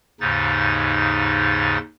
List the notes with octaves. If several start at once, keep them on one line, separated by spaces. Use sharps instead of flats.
D#2 G#2 C#3 D#4 A6